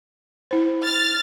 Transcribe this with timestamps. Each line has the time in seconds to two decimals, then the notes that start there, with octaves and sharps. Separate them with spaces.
0.51 E4 C5
0.84 F6 A6